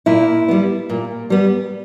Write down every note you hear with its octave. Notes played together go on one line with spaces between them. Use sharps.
A#2 E4
G3 B3
A#2
G3 B3